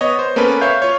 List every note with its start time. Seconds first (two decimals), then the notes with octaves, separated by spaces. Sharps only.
0.01 B3 C#5 D#5
0.19 C5
0.36 A#3 B3 C#4 A4 B4
0.61 C#5 E5 F5 G6
0.82 F4 C#5